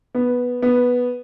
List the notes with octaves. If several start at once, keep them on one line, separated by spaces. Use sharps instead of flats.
B3
B3